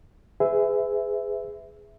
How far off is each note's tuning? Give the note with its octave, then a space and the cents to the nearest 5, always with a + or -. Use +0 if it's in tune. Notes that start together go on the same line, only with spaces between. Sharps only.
G#4 +0 B4 +35 E5 +0